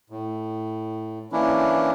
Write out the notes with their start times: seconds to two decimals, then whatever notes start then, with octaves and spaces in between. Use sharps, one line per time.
0.10 A2
1.32 E3 A#3 C#4 D4 E4